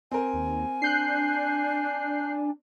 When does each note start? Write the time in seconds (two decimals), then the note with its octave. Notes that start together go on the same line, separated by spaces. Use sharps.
0.11 C4 A#4 G#5
0.34 D#2
0.82 D4 F#6 G6 C7